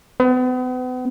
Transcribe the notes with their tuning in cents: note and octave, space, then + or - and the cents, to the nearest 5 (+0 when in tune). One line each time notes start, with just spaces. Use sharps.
B3 +40